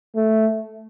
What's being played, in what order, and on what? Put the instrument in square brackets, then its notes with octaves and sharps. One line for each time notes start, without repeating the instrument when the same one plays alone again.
[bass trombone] A3